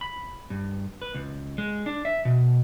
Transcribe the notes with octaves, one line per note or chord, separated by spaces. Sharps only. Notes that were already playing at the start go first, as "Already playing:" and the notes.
B5
G2
B4
C#2
G#3
D4
E5
B2